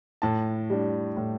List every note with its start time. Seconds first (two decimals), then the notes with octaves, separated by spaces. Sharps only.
0.22 A2 A5
0.70 G3 D4
1.17 A2